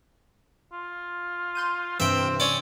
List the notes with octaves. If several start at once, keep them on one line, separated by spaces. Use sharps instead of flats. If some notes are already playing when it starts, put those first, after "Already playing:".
F4
C6 G6 D#7
G2 C3 E3 C4 E5 G5
C#4 D5